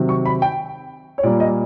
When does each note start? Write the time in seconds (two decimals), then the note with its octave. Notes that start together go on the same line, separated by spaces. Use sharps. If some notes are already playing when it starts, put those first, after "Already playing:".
Already playing: C3 D#3 F#3
0.09 C#6
0.26 B5
0.42 G5
1.18 C#5
1.23 A#2 G3 A#3 D5
1.40 D#5